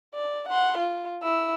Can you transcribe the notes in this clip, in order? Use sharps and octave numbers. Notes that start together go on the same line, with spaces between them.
D5
F#5 C6
F4
E4 E6